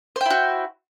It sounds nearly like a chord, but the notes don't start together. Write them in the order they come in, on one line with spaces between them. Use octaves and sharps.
C5 G5 E4 F#4